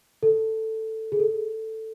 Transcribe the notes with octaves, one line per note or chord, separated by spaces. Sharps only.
A4
G#4
A4